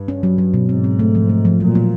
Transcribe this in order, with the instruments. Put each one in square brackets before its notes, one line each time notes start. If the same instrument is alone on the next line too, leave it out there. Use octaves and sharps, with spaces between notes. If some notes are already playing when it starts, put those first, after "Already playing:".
Already playing: [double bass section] G2
[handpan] C#4
F#3
F#3
B2
[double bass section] G#2 [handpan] C4
[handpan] C4
A3
F3
A3
F3
[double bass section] A#2 [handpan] F#3
[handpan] A#3